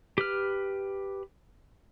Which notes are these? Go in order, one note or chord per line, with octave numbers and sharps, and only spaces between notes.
G4 B4 F6